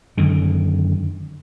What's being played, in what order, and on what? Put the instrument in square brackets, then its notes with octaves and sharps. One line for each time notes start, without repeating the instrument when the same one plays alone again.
[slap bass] F#2 D3 D#3